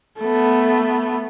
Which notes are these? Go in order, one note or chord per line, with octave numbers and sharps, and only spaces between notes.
A3 B3